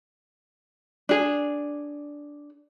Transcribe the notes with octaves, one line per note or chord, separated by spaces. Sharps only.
D4 G#4